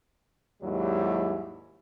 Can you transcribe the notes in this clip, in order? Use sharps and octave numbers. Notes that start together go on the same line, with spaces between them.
D#2 G#2 F#3 G3 E4